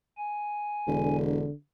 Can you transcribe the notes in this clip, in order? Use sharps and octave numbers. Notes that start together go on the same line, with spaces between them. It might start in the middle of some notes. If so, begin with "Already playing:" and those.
G#5
E1 D3